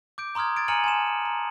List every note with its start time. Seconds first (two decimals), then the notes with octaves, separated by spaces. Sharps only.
0.18 D6 G6 D7
0.35 A#5 C6 D#6 F6 G#6
0.56 G#6 A6 D7
0.68 G#5 A#5 F6 C#7 D#7 F#7
0.84 G#5 A5 C6 E7
1.25 A#5